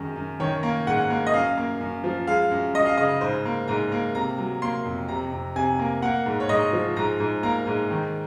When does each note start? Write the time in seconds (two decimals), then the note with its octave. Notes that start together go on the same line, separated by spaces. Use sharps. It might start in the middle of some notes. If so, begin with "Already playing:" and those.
Already playing: F#2 D#3 G#3
0.16 F#2
0.40 D#3 C#5
0.63 A#3
0.87 G#2 F#5
1.10 A#3
1.27 D#5
1.34 F#2 F5
1.57 A#3
1.81 F#2
2.04 F3
2.27 G#3 F5
2.51 F#2
2.75 F#2 D#5
2.86 F5
2.98 C#3 D#5
3.21 G#2 C5
3.45 A#3
3.68 G#2 A#5
3.92 A#3
4.15 C3 A#5
4.39 F#3
4.62 A#3 C6
4.85 F2
5.08 C3 A#5
5.32 F2
5.56 C3 G#5
5.79 A#3
6.02 A#3 F#5
6.26 G#2
6.40 C#5
6.49 G#2 D#5
6.73 F3
6.96 G#2 A#5
7.20 G#2
7.43 A#3 A#5
7.67 G#2
7.91 D#3